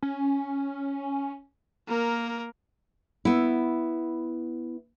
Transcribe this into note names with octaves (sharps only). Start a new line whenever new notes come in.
C#4
A#3 A#4
B3 E4